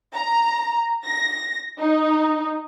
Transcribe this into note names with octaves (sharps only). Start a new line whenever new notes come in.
A#5
A#6
D#4